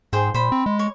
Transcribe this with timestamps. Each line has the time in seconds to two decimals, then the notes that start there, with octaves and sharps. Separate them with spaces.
0.13 G#2 G#4 C5 G5
0.34 A#2 C5 B5
0.52 C4
0.66 G#3
0.79 C#5